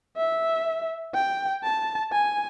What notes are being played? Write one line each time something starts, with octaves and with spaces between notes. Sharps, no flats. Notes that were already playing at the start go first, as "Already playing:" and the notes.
E5
G5
A5
G#5